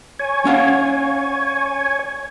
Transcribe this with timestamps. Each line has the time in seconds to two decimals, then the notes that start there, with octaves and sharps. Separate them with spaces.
0.19 C#5 G#5
0.45 C#4 F5 F#5